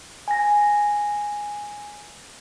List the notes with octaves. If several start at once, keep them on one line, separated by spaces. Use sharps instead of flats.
G#5 A#6